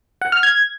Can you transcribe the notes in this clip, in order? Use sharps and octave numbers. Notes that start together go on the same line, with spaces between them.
F#5
F6
G#6